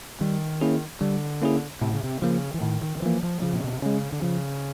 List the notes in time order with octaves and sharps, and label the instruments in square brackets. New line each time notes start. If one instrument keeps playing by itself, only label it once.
[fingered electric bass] D#3 [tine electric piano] G3
[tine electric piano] A#3 C#4 E4 G#4
[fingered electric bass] D3 [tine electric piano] G3
[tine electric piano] A#3 C#4 E4 G#4
[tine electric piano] A2 [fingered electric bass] C3
[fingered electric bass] C#3
C3
[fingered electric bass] C#3 [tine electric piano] F3 A#3
[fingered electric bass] E3
[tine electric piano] A2 [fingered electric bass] D#3
[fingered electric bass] D#3
D#3
[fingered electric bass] E3 [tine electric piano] F3 A#3
[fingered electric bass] F3
[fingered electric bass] C#3 [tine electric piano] F3
[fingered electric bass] A#2
B2
C3
[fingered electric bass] C#3 [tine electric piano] G#3 C#4
[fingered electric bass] D3
[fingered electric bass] C#3 [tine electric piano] F3